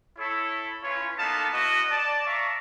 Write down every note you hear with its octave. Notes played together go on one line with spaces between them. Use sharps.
E4 A4 C#5
C#4 E4 F4 B4 C#5
A#3 B3 D#4 A4 F5 A5
E4 F#4 B4 D#5
D5 A5
D5 E5 F5 A#5 C#6